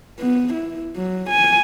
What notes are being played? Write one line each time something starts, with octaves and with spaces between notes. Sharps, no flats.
B3
E4
F#3
G#5